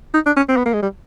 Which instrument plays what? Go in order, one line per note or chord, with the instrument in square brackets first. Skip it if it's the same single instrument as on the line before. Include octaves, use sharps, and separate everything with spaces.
[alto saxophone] D#4
D4
C#4
C4
B3
A#3
G#3
G3